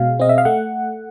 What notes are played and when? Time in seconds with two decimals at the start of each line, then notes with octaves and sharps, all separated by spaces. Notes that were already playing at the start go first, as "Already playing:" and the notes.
Already playing: B2 G#3 F5
0.20 C4 D#5
0.29 E5
0.38 F5
0.45 A3 F#5